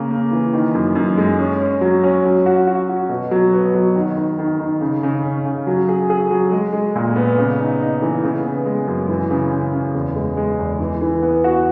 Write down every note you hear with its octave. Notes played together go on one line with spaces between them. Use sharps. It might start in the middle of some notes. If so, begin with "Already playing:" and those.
Already playing: C#3 A#3
A#3
E3
D#3
F#2
F#2
G#3
C#4
C#4
F#3
C#4
F#3
F#4
F#4
F#4
B2
F#3
B3
F#3
D#3
D#3
D#3
D#3
C#3
C#3
C#4
C#3
F#3
G#4
G#4
F#3
G#3
G#3
A#2
B3
C#3
D#4
D#4
E3
C#3
B3
G#3
F#2
E3
C#3
C#3
C#3
E2
G#3
G#3
E2
E3
E3
B3
F#4